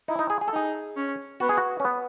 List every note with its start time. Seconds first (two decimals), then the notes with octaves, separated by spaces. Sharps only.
0.08 D#4 E4
0.19 D#4
0.30 G#4
0.41 G#4
0.48 A4
0.53 D#4 G#4
0.96 C#4
1.40 B3 F#4
1.49 G#4
1.57 F#4
1.80 C#4
1.85 B3